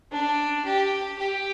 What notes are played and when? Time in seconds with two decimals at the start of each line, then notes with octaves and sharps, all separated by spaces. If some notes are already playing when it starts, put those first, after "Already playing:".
0.11 D4
0.65 G4
1.18 G4